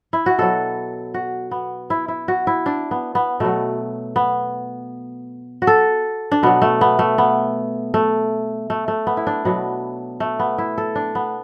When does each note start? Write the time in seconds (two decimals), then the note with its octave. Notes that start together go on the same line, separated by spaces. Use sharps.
0.13 E4
0.26 F#4
0.38 B2 F#3 A4
1.14 F#4
1.51 B3
1.90 E4
2.08 E4
2.28 F#4
2.47 E4
2.66 D4
2.91 B3
3.15 B3
3.40 B2 F#3 A3
4.16 B3
5.62 F#4
5.67 A4
6.31 D4
6.43 B2 F#3 B3
6.62 A3
6.81 B3
6.99 A3
7.18 B3
7.94 A3
8.70 A3
8.88 A3
9.07 B3
9.17 E4
9.27 D4
9.45 B2 F#3 B3
10.20 A3
10.39 B3
10.58 E4
10.78 A4
10.96 D4
11.15 B3